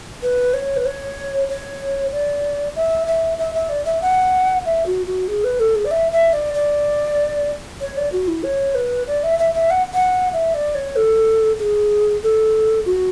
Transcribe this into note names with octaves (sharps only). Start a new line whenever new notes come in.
B4
C#5
B4
C#5
C#5
D5
E5
E5
E5
E5
D5
E5
F#5
E5
F#4
F#4
G#4
B4
A4
G#4
D5
E5
E5
D5
D5
C#5
D5
F#4
E4
C#5
B4
D5
E5
E5
E5
F#5
F#5
E5
D5
C#5
A4
G#4
A4
F#4